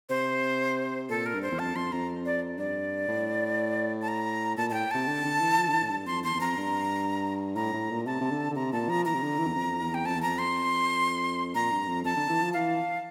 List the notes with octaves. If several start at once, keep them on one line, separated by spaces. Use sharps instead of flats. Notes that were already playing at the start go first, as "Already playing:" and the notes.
C3 C5
A#2 A4
A#4
G2
C5
E2
F2 A5
F2 C6
F2 A#5
D5
G2 D5
A2
A5
A#5
A#2 A5
A2 G5 A5
C3 A5
D3
D3
E3
F3
D3
E3
A2
G2
F2 C6
E2 C6
E2
F2 A#5
G2
A2 A#5
A2
A#2
C3 A5
C3
D3
D3
C3 A#5
A#2 A5
F3 A#5
E3 A#5
C3
D3
E3
E2
F2
E2
G5
F2 A5
E2
F2 A#5
C6
A#2 A#5
G2
F2
F2 A5
D3
E3
F3
E3 F5